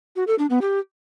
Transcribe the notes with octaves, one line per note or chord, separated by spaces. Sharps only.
F#4
A4
D4
B3
G4